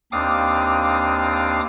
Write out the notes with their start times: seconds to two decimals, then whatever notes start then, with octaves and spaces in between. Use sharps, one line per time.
0.12 D#2 C4 D4 F5 D6 D#6